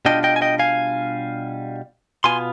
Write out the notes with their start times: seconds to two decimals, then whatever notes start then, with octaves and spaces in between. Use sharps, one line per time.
0.05 B2 G3 D4 F4 D#5 G5
0.24 D#5 G5
0.36 G#5
0.42 D#5 G5
0.59 F5 G#5
2.24 B2 B3 F4 G#5 C6